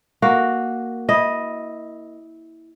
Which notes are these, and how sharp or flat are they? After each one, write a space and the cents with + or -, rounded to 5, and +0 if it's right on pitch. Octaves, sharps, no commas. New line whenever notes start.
A#3 +0 F#4 +0
E4 -15 D#5 +0